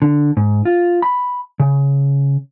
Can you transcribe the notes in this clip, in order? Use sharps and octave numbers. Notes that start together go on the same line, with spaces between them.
D3
G#2
F4
B5
C#3